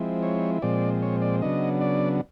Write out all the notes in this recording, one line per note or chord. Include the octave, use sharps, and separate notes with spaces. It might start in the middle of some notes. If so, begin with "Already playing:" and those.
Already playing: F3 G#3 C4 E4
C#5
A#2 F3 G#3 C4 D5
C#5
D5
C#3 F#3 B3 D4 D#5
D5